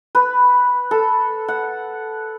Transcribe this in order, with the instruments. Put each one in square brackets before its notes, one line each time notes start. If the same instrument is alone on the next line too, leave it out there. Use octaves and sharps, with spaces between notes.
[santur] B4
A4
F#5